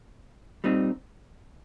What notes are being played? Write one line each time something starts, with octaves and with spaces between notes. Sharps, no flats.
A#2 G3 C4 D#4